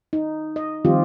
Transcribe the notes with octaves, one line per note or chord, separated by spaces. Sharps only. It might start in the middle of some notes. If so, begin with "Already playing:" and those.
D#4
D#5
D#3 F3 G3 C4 F4 G4